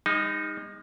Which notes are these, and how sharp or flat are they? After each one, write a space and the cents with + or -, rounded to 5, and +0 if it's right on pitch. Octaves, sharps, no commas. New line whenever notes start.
G#3 -45 D#4 +0